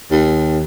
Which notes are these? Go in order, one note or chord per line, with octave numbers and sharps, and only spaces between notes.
D#2